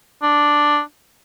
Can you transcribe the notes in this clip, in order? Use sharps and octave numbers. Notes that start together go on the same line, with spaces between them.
D4